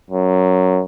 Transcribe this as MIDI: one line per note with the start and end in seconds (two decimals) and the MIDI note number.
0.10 0.82 42